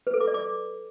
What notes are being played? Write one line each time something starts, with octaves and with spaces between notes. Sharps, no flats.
B4
A4
D6
D5
D6